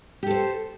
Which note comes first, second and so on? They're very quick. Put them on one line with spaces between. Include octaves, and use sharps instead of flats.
G4 A4 C5